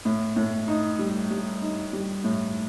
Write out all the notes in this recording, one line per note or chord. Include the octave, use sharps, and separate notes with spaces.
A2
A2
D#4
G3
G3
D#4
G3
A2